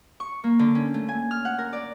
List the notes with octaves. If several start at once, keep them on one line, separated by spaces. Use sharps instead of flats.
C#6
A#3
D3
C#4
A3
G#5
F6
F#5
A#4
D5